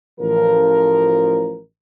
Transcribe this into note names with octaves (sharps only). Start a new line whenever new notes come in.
A1 F3 A#4